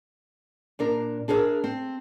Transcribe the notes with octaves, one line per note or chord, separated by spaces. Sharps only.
A#2 D4 A#4
D4 G#4 A#4 C5 E5
C4